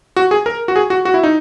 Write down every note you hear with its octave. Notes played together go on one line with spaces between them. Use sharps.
F#4
G#4
A#4
F#4
G#4
F#4
F#4
E4
D#4